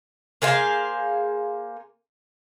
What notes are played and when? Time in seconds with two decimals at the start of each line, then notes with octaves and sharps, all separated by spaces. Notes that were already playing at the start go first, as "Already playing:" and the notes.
0.42 A#3 G#4 C5 F5